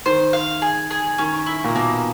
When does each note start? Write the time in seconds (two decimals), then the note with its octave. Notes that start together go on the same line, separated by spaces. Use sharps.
0.06 D#3 C5
0.33 F5
0.62 G#4
0.90 G#4
1.18 D#3 C#4
1.47 E4
1.64 A#2
1.75 B2 A#3